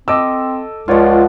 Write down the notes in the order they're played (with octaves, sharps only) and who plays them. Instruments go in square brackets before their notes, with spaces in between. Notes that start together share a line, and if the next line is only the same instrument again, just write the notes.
[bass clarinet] C4 [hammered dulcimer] A4 [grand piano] D#5 D6 E6
[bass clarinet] C#2 [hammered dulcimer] F3 F#5 [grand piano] F4 C#5 D5